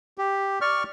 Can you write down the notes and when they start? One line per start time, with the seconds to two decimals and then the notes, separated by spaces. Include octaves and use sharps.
0.18 G4
0.61 D5 C#6 F6